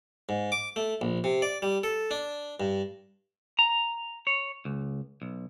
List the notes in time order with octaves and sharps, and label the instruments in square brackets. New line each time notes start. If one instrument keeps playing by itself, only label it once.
[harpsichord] G#2
D6
A3
A#1
C3
D5
G3
A4
D4
G2
[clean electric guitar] A#5
C#5
C#2
B1